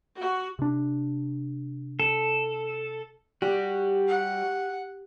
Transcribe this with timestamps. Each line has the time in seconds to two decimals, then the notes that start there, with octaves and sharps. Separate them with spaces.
0.20 F#4
0.59 C3 D4
2.00 A4
3.42 G3 F#4 G4
4.08 F#5